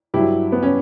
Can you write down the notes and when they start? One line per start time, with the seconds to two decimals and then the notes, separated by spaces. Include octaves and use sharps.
0.14 G2 F#3 E4 G4
0.52 B3
0.63 C#4